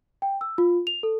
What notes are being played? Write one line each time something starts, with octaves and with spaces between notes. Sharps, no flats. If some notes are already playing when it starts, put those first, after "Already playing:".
G5
E6
F4
F7
A4